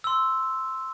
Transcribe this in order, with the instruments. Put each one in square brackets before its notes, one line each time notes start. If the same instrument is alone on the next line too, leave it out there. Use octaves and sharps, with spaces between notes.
[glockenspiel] C6 E6